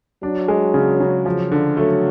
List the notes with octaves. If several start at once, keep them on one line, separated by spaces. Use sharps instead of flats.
F#3 D4
G#3
C#3
C#3
F3
D3
F#3 A3